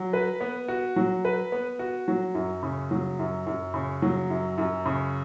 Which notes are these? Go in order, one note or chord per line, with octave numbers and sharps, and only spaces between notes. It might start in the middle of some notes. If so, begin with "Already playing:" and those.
Already playing: F#3
B4
B3
F#4
F#3
B4
B3
F#4
F#3
F#2
C#3
F#3
F#2
F#2
C#3
F#3
F#2
F#2
C#3